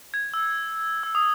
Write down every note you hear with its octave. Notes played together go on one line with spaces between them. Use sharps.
G#6
E6
E6
D#6